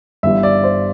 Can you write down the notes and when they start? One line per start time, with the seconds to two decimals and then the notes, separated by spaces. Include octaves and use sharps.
0.23 G1 G2 E3 G3 E5
0.43 D5
0.64 C5